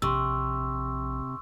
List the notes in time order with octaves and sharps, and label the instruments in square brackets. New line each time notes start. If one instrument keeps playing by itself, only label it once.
[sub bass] A#1 [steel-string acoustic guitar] C3 [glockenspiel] C6 C#6 E6